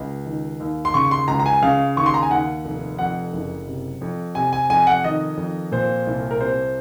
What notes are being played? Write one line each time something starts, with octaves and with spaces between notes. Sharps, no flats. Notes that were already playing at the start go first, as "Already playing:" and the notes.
Already playing: C#2
D#3
D#2
C6
C#3 C#6
C6
C#2 A#5
A#5
G#5
C#3 F5
D#2 C#6
C6
A#5
G#5
D#2 F#5
F1
F2 F#5
F#1
C3
F2
C3 G#5
G#5
F2 G#5
F#5
D#3 D#5
F2
A#2 C5
C2
A#4
C3 C5